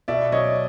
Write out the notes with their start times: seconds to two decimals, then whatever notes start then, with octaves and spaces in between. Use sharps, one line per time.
0.08 B2 D5 E5
0.32 F#3 C#5 D#5